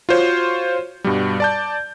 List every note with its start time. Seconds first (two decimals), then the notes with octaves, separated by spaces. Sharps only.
0.09 F4 F#4 C5 C#5
1.04 G2 B2 G3
1.40 D5 A5 G6